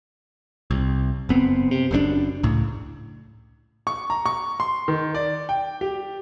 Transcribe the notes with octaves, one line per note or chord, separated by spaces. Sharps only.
C2
F#1 B3 C4
C3
F#1 F#2 B2 D4
C#2 A2
C#6
A#5
C#6
C6
D#3
D5
G5
G4